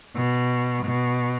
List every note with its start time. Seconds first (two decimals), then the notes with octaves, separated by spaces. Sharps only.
0.16 B2
0.85 B2